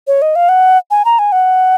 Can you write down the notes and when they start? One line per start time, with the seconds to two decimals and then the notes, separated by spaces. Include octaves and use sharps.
0.07 C#5
0.22 D#5
0.36 F5
0.49 F#5
0.91 G#5
1.05 A#5
1.19 G#5
1.32 F#5